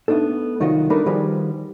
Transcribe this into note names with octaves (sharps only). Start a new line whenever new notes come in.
A3 B3 D4 D#4 A4
C2 D#3 F#3 F4 F#4 D#5
G3 A3 D4 D#4 A#4 B4
D#3 F3 G3 F#4 G#4 B4